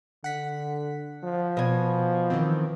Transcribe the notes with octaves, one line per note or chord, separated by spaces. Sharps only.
D3 F#5 B6
F3
B2 G#5
D#3 E3 C4